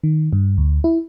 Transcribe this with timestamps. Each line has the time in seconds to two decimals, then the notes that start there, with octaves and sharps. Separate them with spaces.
0.03 D#3
0.33 G2
0.58 D2
0.84 E4